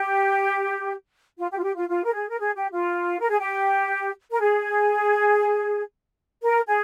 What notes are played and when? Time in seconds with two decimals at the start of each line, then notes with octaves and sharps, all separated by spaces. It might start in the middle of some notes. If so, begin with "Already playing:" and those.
Already playing: G4
1.38 F4
1.51 G4
1.59 F4
1.63 G4
1.76 F4
1.89 F4
2.05 A#4
2.14 G#4
2.28 A#4
2.39 G#4
2.56 G4
2.73 F4
3.20 A#4
3.29 G#4
3.40 G4
4.32 A#4
4.41 G#4
6.42 A#4
6.67 G#4